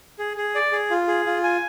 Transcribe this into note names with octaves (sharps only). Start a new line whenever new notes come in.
G#4
G#4
D5
G#4
F4
G#4
F4
G#5